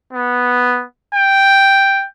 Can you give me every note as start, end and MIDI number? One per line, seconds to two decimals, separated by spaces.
0.13 0.84 59
1.15 2.06 79